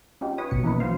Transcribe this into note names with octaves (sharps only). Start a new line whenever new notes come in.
C#4 D#4 F4 G4
B4 C#5 D#6
A#1 B2 C#7
E3 A#3 C#4 D#4 E4 B4
F#3 C5 F5